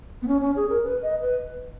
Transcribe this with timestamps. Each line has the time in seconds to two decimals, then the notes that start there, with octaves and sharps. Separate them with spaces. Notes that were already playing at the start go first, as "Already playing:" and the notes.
0.22 B3
0.28 C#4
0.41 C#4
0.56 G#4
0.69 A#4
0.84 B4
1.02 D#5
1.21 B4